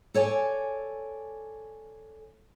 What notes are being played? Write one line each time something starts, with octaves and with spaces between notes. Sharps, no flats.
A4 C#5 D5 G#5